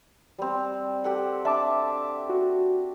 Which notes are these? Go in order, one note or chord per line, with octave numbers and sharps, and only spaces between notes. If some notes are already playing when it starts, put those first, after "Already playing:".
G3 C4
G4 A4 F#5
D4 E5 A5 D6
F#4